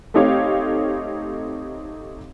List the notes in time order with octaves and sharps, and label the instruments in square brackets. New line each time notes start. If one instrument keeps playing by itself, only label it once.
[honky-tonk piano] A3 C4 D#4 G4 C#5 F5